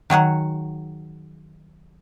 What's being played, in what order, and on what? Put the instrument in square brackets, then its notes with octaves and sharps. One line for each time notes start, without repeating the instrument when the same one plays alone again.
[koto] D#3 F#3 G#4 F#5